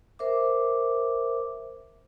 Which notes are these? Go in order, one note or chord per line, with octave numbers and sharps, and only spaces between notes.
A#4 C5 E5 D6